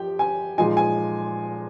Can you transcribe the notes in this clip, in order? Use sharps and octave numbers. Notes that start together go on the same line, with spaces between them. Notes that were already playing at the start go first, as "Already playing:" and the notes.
Already playing: F3 G4 G5
G#5
A#2 F3 G#3 D#4 G#5
G#5